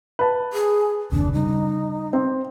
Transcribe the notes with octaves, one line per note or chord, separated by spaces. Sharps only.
B4 A5
G#4
F#1 D#2 C3 D4
C#3 G3 D#4
C4